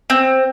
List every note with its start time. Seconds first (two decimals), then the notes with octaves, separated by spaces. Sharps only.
0.10 C4